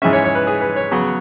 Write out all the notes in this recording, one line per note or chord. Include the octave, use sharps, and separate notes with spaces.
G#2 E3 G#3 C#4 E5
C#5
C#5
B4
G#4
B4
C#5
C#3 F#3 B3